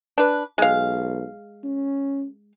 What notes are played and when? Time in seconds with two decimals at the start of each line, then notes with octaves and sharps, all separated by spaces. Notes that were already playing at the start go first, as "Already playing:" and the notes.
0.18 D4 B4
0.58 B1 G#3 F5
1.64 C#4